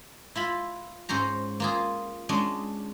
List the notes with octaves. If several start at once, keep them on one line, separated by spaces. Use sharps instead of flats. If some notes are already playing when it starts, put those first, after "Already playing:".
E4 F4 B5
G#2 C#4 C5 A#5
A#3 F4 G#4
G#3 C#4 D4